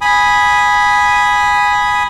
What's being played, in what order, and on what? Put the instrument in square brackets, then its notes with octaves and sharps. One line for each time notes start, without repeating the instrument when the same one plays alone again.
[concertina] G#5 B5 D#6